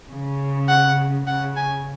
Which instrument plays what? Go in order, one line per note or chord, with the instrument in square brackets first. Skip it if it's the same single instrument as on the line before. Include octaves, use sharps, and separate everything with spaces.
[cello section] C#3
[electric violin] F#5
[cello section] C#3 [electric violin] F#5
[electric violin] G#5